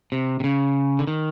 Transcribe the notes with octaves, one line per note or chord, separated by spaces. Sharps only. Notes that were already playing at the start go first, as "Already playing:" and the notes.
C3
C3
C#3
D3
D#3